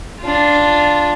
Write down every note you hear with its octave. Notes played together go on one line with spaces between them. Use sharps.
D4 F4